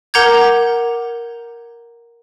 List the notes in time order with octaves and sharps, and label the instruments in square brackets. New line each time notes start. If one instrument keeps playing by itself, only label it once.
[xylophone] A#4 F#5 A#5 D6 G6 G#6